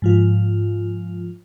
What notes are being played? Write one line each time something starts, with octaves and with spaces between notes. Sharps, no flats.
G#2 F3 F4